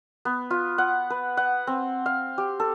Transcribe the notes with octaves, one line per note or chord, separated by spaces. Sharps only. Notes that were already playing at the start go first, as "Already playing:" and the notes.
B3
F4
F#5
B4
F#5
C4
F5
G4
A4